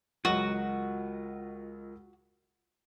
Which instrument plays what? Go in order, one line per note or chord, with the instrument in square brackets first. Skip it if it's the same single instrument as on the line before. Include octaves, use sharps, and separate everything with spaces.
[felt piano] C#2 F#3 [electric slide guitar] F4 A#4 D#5 [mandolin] F#4